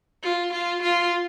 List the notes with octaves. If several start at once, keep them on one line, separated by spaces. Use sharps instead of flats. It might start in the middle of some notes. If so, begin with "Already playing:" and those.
F4
F4
F4